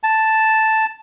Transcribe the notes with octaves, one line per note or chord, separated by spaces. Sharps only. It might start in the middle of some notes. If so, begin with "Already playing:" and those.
A5